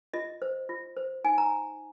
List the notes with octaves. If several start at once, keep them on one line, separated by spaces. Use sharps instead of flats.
F4 D#5
C5
F4
C5
D#4 G#5
A#5